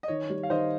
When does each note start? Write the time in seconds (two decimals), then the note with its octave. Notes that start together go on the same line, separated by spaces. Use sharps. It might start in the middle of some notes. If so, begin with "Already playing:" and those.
0.03 D#5
0.08 D#3 C#5
0.30 G3
0.43 F5
0.50 D#3 C5 D#5